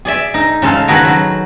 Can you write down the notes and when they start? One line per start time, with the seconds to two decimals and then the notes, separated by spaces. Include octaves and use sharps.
0.05 G#4 D5 E5
0.34 D#4
0.62 C#3 G#3 A4 F5
0.88 D#3 D#4 F#4 G#4 A4 B4
1.05 F#3